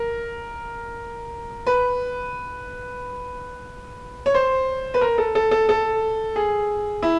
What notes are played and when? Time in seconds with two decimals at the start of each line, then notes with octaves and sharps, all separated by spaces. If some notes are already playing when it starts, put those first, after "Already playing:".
Already playing: A#4
1.67 B4
4.26 C#5
4.34 C5
4.94 B4
5.01 A#4
5.18 A4
5.35 A4
5.51 A4
5.69 A4
6.36 G#4
7.03 E4